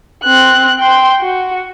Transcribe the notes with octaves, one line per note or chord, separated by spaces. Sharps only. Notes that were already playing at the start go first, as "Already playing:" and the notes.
C4 F#6
G5 C6
F#4